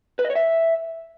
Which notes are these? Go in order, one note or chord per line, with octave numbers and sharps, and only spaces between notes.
B4
D#5
C#5
E5